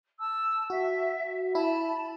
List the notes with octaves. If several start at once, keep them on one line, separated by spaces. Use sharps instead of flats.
A5 E6
F#4 E5
E4 A5 B5